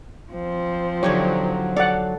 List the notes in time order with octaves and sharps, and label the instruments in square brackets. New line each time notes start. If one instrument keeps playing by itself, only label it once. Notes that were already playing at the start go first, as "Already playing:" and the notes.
[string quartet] F3 C4
[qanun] D3 D#4 G4 [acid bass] F#3 [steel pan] C#5
[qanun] A4 F5 [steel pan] D5 F#5